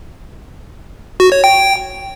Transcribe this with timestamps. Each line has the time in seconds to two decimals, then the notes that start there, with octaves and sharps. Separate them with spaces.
1.20 F#4
1.32 C#5
1.44 G5